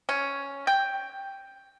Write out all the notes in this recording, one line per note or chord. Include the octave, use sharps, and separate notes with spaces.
C#4
G5